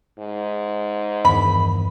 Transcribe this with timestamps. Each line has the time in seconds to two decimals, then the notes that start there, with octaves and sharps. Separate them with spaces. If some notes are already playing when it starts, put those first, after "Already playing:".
0.19 G#2
1.25 E2 G2 D#3 B5